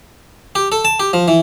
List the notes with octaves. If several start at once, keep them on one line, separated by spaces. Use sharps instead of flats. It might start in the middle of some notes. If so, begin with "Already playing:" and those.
G4
A4
A5
G4
F3
E3